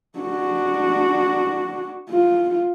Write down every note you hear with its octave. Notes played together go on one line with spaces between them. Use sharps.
D4 F#4
F4